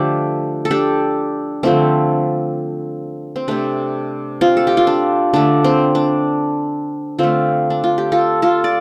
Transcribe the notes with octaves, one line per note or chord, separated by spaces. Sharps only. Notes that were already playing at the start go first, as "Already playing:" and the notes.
Already playing: D3 F3 A3 D4 G4
A4
D4 G4
D3 F3 A3 C4
C4
C3 A3 D4
C4 F4
A4
G4
F4
D4
D3 A3 D4
C4
D4
D3 A3 C4 F4
D4
F4
G4
F4 A4
F4 A4
D5